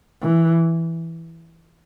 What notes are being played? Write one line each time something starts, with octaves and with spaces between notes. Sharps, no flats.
E3